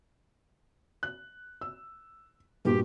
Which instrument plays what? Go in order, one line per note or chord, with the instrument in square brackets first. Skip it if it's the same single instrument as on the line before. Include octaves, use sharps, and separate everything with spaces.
[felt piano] F#6
E6
[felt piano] G2 A#2 F#4 [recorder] G4